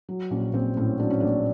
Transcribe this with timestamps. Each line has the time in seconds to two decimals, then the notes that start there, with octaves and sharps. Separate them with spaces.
0.09 F#3
0.31 A#1 C#4
0.53 A#1 C4
0.77 A2 C#4
0.99 F#3 D4
1.10 C#4
1.20 A#1 D4